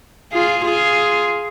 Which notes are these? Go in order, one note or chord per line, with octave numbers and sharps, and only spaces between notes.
F4 G#4
F4 G#4